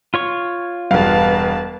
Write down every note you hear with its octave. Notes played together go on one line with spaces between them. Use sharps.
F4 C#5 C#6
E1 G2 B4 F5 A5